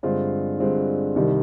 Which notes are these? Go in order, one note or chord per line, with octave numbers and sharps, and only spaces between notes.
G2 D3 G#3 C4 F4
G2 D3 G#3 C4 F4
C2 C3 D#3 G3